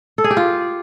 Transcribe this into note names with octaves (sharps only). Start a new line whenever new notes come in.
A4
G#4
G4
F4